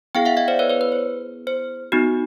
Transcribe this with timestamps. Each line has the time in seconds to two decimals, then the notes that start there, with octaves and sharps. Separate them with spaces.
0.15 B3 E4 G#4 F5 G5
0.25 E5 F#5
0.37 D#5 F5
0.48 C5 D5
0.59 B4 C#5
0.69 B4 C#5
0.81 B4
0.92 C5
1.47 C5
1.92 B3 D#4 F#4